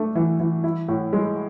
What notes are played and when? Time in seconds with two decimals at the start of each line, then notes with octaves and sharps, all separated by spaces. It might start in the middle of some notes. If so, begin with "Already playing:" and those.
Already playing: A3 D4
0.15 E3
0.40 E3
0.64 E4
0.88 A2
1.13 G#3